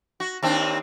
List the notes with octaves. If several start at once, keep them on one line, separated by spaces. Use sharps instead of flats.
F#4
D#2 C4 D4